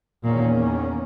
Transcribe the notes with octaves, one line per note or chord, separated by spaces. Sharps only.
E2 A#2 D#3 A#3 C#4